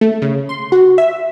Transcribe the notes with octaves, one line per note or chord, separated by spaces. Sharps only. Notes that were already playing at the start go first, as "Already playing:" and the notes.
A3
C#3
C6
F#4
E5